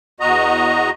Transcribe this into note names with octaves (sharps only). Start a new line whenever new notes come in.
E2 F#4 D#5 A#5